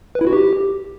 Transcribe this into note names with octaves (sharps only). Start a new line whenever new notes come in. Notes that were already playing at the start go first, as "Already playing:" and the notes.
B4
E4
F#4
G4